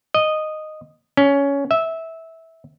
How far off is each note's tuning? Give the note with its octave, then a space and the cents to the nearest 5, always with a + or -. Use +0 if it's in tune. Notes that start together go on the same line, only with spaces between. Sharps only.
D#5 -10
C#4 +15
E5 -15